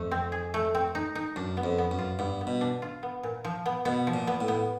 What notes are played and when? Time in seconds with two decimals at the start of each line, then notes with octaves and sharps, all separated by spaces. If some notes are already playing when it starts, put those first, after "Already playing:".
Already playing: F2 A3
0.11 C4
0.32 G#4
0.54 A3
0.75 C4
0.95 D#4
1.15 D#4
1.36 F#2 D4
1.57 B3
1.64 F2
1.78 B3
1.91 F#2
1.99 F4
2.19 G2 B3
2.41 B3
2.47 B2
2.61 D4
2.82 F4
3.03 B3
3.23 A#2
3.45 F3
3.66 B3
3.85 B2 B3
4.07 F3
4.14 A#2
4.27 B3
4.41 A2
4.48 B3